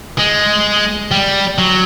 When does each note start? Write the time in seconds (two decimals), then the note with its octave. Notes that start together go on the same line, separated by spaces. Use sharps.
0.19 G#3
1.11 G3
1.58 F#3